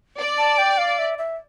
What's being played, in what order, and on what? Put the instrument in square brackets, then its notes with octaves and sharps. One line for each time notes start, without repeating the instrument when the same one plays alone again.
[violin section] D5
[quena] A5
G5
F5
E5
E5